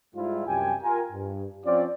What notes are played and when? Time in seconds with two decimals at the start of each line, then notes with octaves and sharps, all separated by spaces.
0.15 G#2 G3 E4 F4
0.47 C2 F#2 G4 G5 G#5
0.83 F4 A#4 G#5
1.12 G2
1.65 F3 C4 C#4 F4 D5